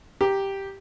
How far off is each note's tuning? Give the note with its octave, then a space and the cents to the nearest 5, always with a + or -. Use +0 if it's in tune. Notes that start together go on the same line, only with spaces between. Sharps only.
G4 +0 A#5 +0